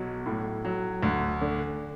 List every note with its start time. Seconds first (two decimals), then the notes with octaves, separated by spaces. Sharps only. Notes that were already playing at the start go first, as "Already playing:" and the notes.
Already playing: B1 F#3
0.26 A2
0.65 F#3
1.03 D2
1.41 D3